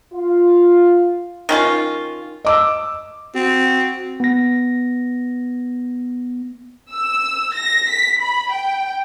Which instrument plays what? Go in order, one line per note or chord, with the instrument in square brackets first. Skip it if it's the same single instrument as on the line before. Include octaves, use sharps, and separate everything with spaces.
[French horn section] F4
[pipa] D#3 C#4 F4
[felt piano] D#5 D6 E6
[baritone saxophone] C4 [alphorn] F#4
[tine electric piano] B3 A#6
[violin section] E6
A#6
B6
B5
G5